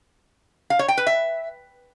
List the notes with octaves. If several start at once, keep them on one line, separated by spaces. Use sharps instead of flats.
F5
C#5
G5
B4
E5